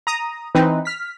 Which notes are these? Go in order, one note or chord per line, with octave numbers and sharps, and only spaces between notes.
A#5 D#6
E3 C4 D#4 B4
F6 B6